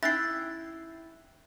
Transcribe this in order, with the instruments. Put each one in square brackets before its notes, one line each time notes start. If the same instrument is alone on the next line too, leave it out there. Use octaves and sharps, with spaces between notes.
[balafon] C#4 D#4 [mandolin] E4 G5 F#6 [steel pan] E5 [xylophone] A6 C7